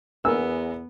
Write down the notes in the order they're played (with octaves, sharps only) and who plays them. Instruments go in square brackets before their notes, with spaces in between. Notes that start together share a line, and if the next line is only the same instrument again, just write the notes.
[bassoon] E2 [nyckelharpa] B3 [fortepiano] A#4 G#5 E6